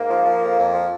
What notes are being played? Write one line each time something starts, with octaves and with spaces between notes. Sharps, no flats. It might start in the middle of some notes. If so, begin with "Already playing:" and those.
Already playing: G#2 A#3
F3
F3
F2
F2
F3